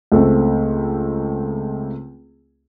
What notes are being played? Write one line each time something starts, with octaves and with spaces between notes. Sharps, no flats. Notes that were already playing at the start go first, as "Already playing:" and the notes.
C#2 A3 C4